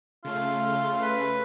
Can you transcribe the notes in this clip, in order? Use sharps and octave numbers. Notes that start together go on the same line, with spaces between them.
C#3 A3 F4
B4